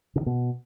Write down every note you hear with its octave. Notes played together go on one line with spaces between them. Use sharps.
C#3
D#3
B2